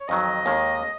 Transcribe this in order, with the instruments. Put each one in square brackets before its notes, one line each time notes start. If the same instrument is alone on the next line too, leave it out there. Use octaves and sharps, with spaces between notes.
[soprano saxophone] C#5
[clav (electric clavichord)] F2 D#3 F#3 [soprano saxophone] D#5
[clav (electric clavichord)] D#2 D#3 G#3